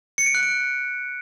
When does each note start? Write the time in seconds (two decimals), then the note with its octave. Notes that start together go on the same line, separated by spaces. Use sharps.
0.18 C#7
0.26 D7
0.35 F#6
0.43 D7